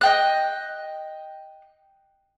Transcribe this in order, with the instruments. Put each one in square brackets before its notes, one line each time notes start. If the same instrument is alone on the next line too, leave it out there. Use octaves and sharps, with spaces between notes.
[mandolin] D#5 G5 F#6